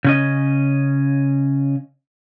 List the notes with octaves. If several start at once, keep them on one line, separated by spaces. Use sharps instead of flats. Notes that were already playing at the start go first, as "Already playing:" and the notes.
C#3 C#4 D#5